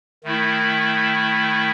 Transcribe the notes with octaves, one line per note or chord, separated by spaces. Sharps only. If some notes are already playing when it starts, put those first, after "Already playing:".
D#3 A3 E4